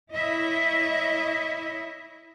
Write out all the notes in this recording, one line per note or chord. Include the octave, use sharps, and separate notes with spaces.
E4 C#5 D#5 E5